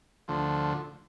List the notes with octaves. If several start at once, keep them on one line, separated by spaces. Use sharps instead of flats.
D2 D3 F3